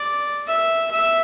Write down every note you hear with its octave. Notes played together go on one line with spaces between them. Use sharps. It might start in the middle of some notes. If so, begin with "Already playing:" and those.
Already playing: D5
E5
E5